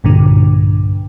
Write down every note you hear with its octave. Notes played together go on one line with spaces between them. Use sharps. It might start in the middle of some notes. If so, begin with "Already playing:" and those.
B1 G2 A#2 D3